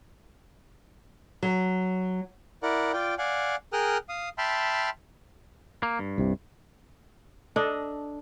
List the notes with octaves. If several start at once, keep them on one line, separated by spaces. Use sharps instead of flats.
F#3
E4 A#4 D5 F#5
F4 D5 G5
D5 F5 F#5 G#5
G#4 A#4 G5 D#6 F6 F#6
F5 D#6
E5 G5 A5 B5 C6 F6
A#3
G2
C2 C3
D4 A4 D#5